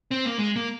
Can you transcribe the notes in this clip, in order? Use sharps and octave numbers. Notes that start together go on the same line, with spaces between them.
C4
A#3
G#3
A#3